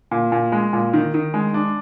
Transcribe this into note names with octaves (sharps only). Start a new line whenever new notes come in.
A#2
A#2
G#3
A#2
D#3
D#3
G#3
D4